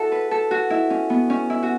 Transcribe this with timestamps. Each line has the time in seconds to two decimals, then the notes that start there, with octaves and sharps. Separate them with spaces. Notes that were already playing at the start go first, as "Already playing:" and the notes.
Already playing: E4 F#4 A4
0.12 B4
0.31 A4
0.51 F#4
0.70 E4
0.90 C#4
1.10 B3
1.30 C#4
1.50 E4
1.63 F#4